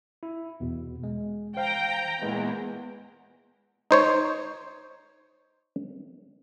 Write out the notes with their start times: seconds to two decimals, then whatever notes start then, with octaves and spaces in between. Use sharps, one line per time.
0.23 E4
0.60 E2 B2
1.03 G#3
1.57 C5 F5 G5 A#5
2.22 E2 A#2 G#3 A#3
3.91 D#4 C5 C#5